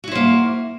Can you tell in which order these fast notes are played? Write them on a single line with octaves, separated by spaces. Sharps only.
F#4 E4 C5 A#3